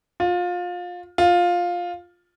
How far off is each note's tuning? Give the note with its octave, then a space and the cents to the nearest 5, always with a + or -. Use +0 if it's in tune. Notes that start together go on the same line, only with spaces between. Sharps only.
F4 +25
F4 +10